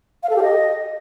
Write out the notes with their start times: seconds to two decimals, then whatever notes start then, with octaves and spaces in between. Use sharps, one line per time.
0.23 F5
0.30 A4
0.36 G4
0.43 D#5